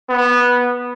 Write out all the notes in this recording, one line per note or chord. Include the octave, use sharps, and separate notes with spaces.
B3